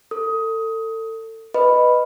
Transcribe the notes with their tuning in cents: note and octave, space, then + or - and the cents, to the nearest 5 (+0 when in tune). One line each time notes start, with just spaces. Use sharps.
A4 +30 D#6 +15
B4 +0 D#5 -10 B5 +0